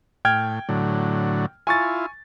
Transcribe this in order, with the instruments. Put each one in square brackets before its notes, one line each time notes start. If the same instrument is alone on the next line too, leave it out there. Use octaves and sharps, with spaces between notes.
[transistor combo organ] A2 [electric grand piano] G5 F6 G#6
[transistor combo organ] A2 D3 F#3
[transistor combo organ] E4 F4 [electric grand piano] G#5 C#6 A6